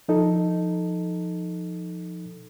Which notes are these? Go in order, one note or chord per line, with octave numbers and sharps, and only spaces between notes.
F3 D#4 A4